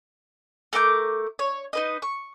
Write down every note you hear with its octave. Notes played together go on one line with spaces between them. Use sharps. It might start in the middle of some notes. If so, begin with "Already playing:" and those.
A3 A#4 D6 G6
C#5
D#4 B4 D#5
C#6